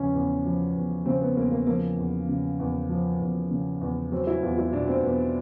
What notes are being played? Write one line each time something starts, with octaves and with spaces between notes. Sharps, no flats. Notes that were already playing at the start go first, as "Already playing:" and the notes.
Already playing: E2 C#3 F3 C#4
E2
F3
E2
C#3 C4
B3
E2 A#3
A#3
F3 A#3
E2
C#3
E2
F3
E2
C#3
E2
F#3 C4
E4
E2 F4
E4
B2 D4
C4
E2 B3